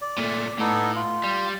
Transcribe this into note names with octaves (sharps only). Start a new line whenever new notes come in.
D5
A#2 A3
A2 B3 D#4 A4
F4
G3